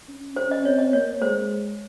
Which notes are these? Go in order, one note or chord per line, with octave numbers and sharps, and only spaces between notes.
C#4
C#4 C5
D#5
C4 C#5
D#5
A#3 C#5
G#3 C5